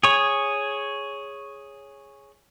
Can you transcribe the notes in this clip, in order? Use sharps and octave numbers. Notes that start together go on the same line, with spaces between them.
G#4 C#5